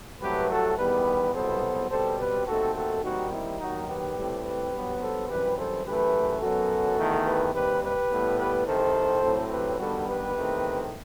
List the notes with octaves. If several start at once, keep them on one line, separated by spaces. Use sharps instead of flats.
C2 C3 F#3 A3 G4 B4
F#4 A4
E2 D#3 G3 B3 G4 B4
C2 B2 F#3 B3 A4 C5
B2 G3 C4 A4 C5
G4 B4
D#2 D#3 A3 C4 F#4 A4
F#4 A4
D#2 D#3 G3 C4 D#4 F#4
C4 E4
D#2 D#3 F#3 D#4 F#4
G4 B4
A2 G3 C4
G4 B4
G2 F#3 B3
A4 C5
F#2 E3 G3 C4 G4 B4
A4 C5
F#2 E3 A3 G4 B4
F#2 F#3 B3 F#4 A4
E2 D#3 A3
G4 B4
D#2 D#3 G3 C4 G4 B4
G4 B4
A2 G3 B3
G4 B4
C2 C3 D#3 A4 C5
A2 F#3 C4
G4 B4
G2 D#3 G3 B3 F#4 A4
G4 B4
E2 D#3 A3 C4